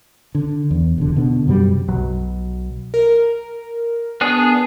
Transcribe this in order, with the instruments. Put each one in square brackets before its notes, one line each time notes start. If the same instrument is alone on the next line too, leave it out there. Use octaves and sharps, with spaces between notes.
[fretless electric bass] D3
E2
E1 D3
B2 D3
F#2 C3 F#3 G3
[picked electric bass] B1 B2 F#3
[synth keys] A#4
[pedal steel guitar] B3 D4 G#4